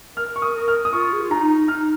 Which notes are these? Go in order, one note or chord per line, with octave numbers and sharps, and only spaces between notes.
A#4 F6
C#6
D#6
A#4
F6
D#6
F4 C#6
G#4
F4
D#4 A#5
D#4 F6